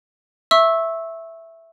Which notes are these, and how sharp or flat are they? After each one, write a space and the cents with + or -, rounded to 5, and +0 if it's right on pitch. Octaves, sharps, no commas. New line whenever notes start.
E5 +0 C#6 -25 E6 -10